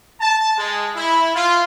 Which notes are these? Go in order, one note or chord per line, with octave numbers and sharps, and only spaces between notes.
A5
G#3
E4
F4